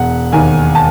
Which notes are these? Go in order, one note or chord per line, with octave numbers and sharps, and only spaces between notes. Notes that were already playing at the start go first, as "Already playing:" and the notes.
Already playing: E1 F#5
D#2 D#3 G#5
A5